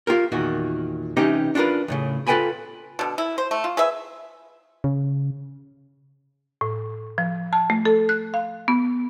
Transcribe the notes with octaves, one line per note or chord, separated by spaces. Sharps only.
F4 G4 A#4
E2 A#2 D#3 F#4
C3 E3 C#4 D#4 G4
D4 F4 F#4 A#4 B4
D#2 A2 C#3
F4 A4 B4 G5 G#5 B5
B2 D3
E4
C5
A3
F4
G#4 B4 E5
C#3
A2
F3
A5
A3
A4
F#6
F5
B3